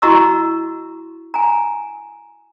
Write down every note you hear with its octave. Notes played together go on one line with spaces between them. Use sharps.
E4 F#4 D#5 A#5 C#6 E6
G#5 A#5